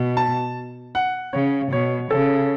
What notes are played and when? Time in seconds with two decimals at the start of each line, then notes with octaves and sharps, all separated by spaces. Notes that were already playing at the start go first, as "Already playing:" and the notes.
Already playing: B2
0.17 A5
0.95 F#5
1.33 C#3 C#5
1.72 B2 C#5
2.11 C#3 A4